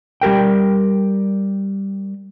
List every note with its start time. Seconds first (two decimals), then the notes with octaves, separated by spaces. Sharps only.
0.21 G3 G4 A#4 G5